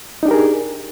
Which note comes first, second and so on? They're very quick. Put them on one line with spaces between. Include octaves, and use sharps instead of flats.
D#4 D4 G4 A#4 G#4